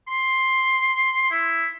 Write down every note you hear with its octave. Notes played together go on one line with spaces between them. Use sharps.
C6
E4